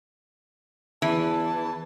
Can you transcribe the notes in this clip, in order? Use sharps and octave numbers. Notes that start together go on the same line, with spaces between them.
E2 E3 A5